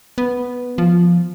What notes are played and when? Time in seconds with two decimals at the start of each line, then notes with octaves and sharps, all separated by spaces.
0.18 B3
0.78 F3